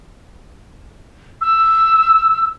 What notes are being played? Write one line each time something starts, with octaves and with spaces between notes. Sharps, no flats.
E6